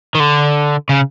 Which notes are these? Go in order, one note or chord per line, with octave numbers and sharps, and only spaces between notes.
D#3
D3
C#3